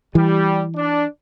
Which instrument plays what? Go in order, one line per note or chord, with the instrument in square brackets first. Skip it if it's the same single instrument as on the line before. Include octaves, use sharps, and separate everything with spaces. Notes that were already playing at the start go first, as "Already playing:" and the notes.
[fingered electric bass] E3 [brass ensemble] G3
[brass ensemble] D4